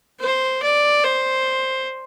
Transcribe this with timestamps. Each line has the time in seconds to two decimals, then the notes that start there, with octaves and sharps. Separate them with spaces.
0.21 C5
0.63 D5
1.04 C5